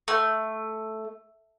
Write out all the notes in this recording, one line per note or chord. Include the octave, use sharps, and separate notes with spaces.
A3